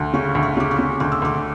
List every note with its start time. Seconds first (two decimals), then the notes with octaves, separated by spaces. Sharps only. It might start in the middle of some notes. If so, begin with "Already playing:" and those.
Already playing: D2
0.13 C#3 C#6
0.35 D2
0.43 C#6
0.57 C#3 D6
0.71 C#6
0.79 C#3
1.00 D2 D6
1.12 E6
1.22 D2 D6